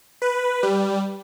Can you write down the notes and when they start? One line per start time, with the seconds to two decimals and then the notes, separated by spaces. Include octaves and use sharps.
0.22 B4
0.63 G3